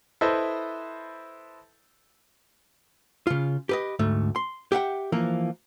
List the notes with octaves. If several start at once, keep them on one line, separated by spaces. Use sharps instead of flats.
E4 A4 B4 C5 D#5
C#3 F4
G4 B4 D#5
D2 G#2 A3
C6
G4 E5 F#5 G5
E3 F3 A#3